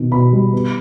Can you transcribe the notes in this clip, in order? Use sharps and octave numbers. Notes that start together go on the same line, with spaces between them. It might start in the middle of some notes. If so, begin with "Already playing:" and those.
Already playing: B2 D#3 B3
B2 B5
G3
B3